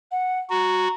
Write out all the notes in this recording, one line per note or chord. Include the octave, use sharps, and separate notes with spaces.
F#5
F#4 A#5